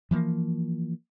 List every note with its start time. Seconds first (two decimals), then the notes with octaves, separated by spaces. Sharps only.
0.11 E3 F3 G#3 A#3